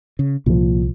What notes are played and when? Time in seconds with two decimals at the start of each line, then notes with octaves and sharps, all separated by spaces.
0.19 C#3
0.46 C2 A#2 F3